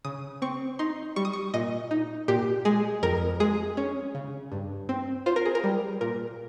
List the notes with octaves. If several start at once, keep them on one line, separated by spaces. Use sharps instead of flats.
C#3 D#6
C4 C#6
D#4 C6
G3 C#6
D#6
C#6
A#2 D#5
D#4
A#2 G4
G#3 G#4
F2 A#4
G#3 G#4
C#4
C#3
G2
C4
F4 C5
A#4
G#4
A#4
G3
A#2 A#4